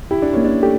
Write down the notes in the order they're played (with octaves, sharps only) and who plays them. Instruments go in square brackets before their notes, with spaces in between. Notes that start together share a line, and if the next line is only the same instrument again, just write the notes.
[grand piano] E4 [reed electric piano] G4
[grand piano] D4
[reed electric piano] A#3 [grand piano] C#4
[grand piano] D4
[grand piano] A3 [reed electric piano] G4